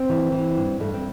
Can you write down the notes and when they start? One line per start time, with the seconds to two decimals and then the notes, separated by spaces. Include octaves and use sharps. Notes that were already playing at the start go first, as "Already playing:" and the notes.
Already playing: C4
0.10 E3
0.32 E3
0.57 G2
0.80 G2 A3
0.94 C4